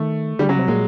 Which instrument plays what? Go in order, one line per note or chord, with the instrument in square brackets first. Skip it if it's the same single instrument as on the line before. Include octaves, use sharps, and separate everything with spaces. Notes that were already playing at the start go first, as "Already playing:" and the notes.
Already playing: [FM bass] D#3 [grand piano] A3
[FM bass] D3 [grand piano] G3
[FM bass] C#3 [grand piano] F#3
[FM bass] C3
[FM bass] A#2 [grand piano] G#3